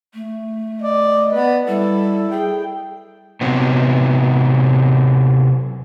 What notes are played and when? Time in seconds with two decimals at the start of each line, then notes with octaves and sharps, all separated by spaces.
0.15 A3
0.82 D5 D#5
1.34 B3 B4 D5
1.68 G3 E4 A4
2.31 G#4 G5
3.41 C3 F#3 B3